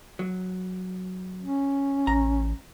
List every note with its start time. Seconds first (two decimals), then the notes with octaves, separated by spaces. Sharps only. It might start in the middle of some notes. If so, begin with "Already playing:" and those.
0.19 F#3
1.41 C#4
2.07 A1 A#5